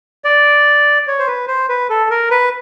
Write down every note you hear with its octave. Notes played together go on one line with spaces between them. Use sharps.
D5
C#5
C5
B4
C5
B4
A4
A#4
B4